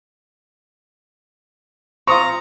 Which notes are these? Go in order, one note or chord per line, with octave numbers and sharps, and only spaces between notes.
C4 F4 A#5 C#6 D#6